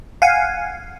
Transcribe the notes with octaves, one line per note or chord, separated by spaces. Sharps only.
F5 F#5 G#5